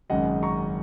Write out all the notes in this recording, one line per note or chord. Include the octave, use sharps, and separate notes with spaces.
G#1 F#2 C#3 G#3 D#5 F#5
A#5 C#6